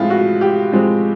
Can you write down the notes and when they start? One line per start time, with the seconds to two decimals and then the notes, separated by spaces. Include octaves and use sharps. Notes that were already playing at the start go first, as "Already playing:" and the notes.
Already playing: A2 F3 G#3 C4 E4 F4
0.10 F#4
0.41 G4
0.72 A2 F3 G#3 C4